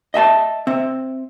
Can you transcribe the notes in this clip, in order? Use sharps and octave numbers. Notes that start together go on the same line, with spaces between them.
D#5 E5 G#5 A5
C4 E5